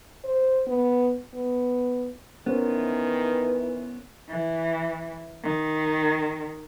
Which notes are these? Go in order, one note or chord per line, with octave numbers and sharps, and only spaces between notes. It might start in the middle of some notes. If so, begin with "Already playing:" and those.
C5
B3
B3
D#3 E3 B3 C#4 A#4 C5
E3
D#3